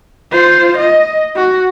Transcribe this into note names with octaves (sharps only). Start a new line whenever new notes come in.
F4 C5
D#5
F#4